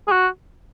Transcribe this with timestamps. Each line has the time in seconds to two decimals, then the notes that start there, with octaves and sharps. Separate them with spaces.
0.08 G#4
0.12 F#4